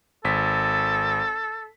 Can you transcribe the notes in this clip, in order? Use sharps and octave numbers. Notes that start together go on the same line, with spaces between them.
G#1 A4 B6